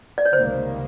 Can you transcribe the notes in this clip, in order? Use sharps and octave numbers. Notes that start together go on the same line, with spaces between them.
D5
C#5
C#2 C3 D#3 G3 A#3 C5